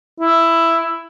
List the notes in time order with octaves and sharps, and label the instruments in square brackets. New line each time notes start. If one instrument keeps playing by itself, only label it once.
[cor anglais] E4